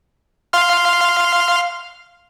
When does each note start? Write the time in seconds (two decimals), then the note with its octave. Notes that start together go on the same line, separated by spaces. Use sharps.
0.53 F5 C6 F6